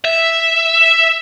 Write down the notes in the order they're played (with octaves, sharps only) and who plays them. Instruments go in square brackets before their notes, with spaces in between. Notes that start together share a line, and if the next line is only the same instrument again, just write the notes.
[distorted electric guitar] E5